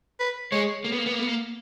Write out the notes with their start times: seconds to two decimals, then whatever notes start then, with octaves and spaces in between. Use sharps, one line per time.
0.20 B4
0.52 G#3 C#5
0.84 A#3
0.92 B3
0.98 A#3
1.06 B3
1.13 A#3
1.19 B3
1.27 A#3